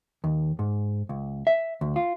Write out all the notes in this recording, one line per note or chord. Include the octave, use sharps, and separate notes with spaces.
D#2
G#2
C#2
E5
D2
F4